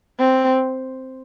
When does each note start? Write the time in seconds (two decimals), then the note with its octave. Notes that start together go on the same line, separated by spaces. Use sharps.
0.19 C4